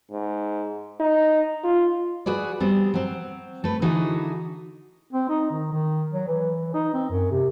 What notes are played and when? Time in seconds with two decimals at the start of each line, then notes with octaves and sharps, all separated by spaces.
0.11 G#2
1.00 D#4
1.64 F4
2.26 F#4 G#4 B4 D5
2.60 G3 B3 C4 G#4
2.94 F#3 C4
3.64 A3 B4
3.82 D3 E3 D#4 E4 F#4 G#4
5.13 C4
5.29 D#4
5.51 D#3
5.73 D#3
6.12 F#3
6.28 E3
6.74 D#4
6.94 C4
7.10 F#2
7.31 C3